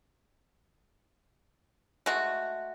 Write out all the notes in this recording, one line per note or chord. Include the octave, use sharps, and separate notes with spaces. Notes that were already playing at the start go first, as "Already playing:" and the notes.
G#3 A3 F#4